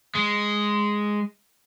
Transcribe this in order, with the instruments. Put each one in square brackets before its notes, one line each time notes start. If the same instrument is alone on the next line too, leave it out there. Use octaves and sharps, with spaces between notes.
[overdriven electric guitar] G#3